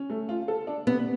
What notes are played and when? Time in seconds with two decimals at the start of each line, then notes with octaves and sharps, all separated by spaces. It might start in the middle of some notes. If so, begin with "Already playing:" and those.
Already playing: C#4
0.10 A3
0.29 F4
0.48 A4
0.67 D4
0.87 C3 B3